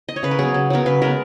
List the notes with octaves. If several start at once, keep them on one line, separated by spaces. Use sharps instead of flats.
D#5
C#5
C#3 B4
A#4
F#3 B3 G#4
C#3
F#3 B3 A#4
C#3 B4
G#3 B3 A#4